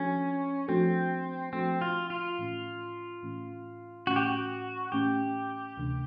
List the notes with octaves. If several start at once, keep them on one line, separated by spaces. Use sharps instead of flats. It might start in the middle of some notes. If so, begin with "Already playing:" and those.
Already playing: F3 A3 C#4 D4 F#4 A4
F3 A3 C4 D4 F#4 A4
F3 A3 C4 D4 F#4 A4
F4
F4
A2 E3 A3 C#4
A2 E3 A3 C#4
A2 E3 A3 C#4 F#4
G4
F#4
A2 E3 A3 C#4 G4
D2 C3 E3 A3 D4